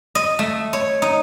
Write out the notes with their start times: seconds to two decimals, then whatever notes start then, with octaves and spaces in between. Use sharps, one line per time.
0.15 D#5
0.39 A3
0.73 C#5
1.02 D#4